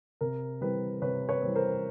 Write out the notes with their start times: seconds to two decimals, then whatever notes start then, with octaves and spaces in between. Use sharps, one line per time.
0.21 C3 A#4
0.61 E3 G3 C4 B4
1.02 C3 B4 C#5
1.29 B4 C#5
1.42 E3 G3 C4
1.55 A#4 C5